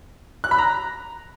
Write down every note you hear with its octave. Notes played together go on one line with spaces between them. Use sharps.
F#6
B5
A#5